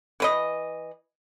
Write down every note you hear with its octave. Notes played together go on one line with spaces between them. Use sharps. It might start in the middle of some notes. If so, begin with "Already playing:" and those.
E3 B4 D#5